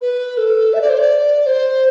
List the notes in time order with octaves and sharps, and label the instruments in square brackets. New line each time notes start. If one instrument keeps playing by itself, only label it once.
[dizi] B4
A4
E5
D5
C5
D5
C5